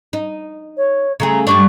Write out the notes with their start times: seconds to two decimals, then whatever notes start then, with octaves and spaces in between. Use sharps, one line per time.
0.13 D#4
0.76 C#5
1.20 C#3 A3 G#4 A#5
1.47 G2 G3 D4 C#6